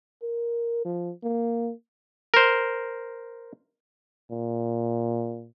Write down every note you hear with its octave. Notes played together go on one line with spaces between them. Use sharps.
A#4
F3
A#3
A#4 C5
A#2